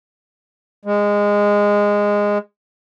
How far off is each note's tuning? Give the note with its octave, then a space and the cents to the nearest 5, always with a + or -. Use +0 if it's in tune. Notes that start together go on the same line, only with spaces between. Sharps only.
G#3 -15